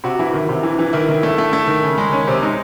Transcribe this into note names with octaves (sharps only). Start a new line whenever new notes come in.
C3 F#4
E3 E4
D#3
C3
E3
E3
D#3 E4
D#3
A3
A3
A3
D#3
C#3
G#3
D#3 C#4
C3 C4
G#3 D#4